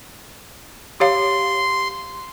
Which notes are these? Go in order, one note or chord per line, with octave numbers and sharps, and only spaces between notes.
G4 C#5 F5 C6